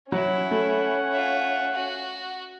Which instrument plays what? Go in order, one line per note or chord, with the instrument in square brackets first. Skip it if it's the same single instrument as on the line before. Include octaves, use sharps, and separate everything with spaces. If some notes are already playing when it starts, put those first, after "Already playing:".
[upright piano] F#3 [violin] C#4 [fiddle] E4 [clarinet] F#5
[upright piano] A3
[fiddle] F4 E5
F#4